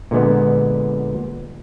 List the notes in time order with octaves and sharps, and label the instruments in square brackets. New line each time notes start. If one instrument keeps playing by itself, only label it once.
[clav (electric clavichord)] A#2 D3 G#3 B3